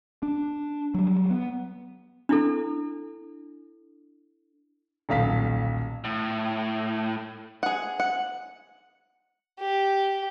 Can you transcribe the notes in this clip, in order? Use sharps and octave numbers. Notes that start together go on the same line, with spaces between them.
D4
F#3 G3
B3
D4 E4 A4
D#1 B1 F5 B6
A2
G#4 F#5
F#5
G4